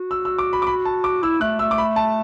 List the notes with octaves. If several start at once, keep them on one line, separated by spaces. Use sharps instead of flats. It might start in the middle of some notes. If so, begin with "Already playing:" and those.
Already playing: F#4
E6
E6
D6
B5
D6
B5
A5
D6
E4 E6
A3 F#6
A3 E6
D6
B5
A5